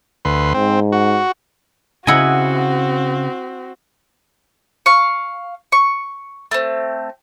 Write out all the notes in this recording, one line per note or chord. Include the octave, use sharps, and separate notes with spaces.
D2 B4 C6
G#2 C4
F#4
C#3 C4 E4 F#4 D#5 F#5 G#5
F5 C#6
C#6
A3 C4